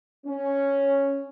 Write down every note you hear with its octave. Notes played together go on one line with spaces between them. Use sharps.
C#4